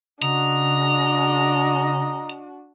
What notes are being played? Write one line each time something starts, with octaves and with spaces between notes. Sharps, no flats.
C#3 D4 F#4 D#5 A#5